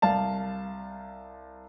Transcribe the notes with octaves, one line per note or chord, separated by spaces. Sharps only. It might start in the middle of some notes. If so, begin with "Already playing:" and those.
C2 F5 A5